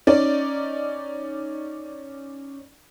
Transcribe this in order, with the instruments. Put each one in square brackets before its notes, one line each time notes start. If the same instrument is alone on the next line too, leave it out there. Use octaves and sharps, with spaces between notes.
[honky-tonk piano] C#4 D#4 D5